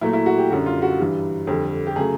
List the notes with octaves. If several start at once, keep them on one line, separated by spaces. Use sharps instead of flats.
A#2 F#3 A3 E4
E4
F#4
G4
F#2 D3 G3 F#4
F4
F#4
G2 E3 G3
F2 D3 G3
G4
C#3 F#3 A3 G#4